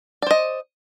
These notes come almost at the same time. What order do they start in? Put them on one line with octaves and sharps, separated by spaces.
D5 C5 D#5